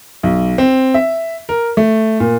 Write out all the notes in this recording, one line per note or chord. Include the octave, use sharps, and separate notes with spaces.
B1
C4
E5
A#4
A3
A#2